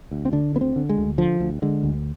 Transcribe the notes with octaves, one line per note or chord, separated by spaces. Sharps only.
D2
C4
D3 D4
D2 B3
C4
D3
G#3
D2
D3 F3
D2
D3 G#3
D2